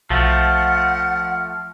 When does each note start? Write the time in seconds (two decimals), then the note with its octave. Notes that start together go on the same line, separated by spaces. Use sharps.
0.10 B1 F3 A3 F#5 F6